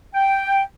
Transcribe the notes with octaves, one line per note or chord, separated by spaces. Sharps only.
G5